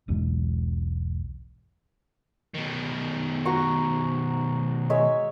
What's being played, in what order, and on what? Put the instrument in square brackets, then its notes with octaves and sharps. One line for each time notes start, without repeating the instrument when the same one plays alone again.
[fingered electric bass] E1 B1 E2 G#2
[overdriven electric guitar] B2 D#3
[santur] F#4 A#5 C#6
G#3 C#5 E5